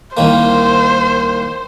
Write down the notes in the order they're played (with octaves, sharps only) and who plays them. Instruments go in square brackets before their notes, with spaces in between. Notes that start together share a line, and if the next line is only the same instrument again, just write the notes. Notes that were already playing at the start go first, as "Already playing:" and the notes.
[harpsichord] C2 D#3 A#3 [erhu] C5